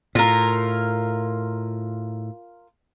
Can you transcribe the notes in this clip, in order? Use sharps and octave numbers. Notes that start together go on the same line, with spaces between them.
A2 F4 A#4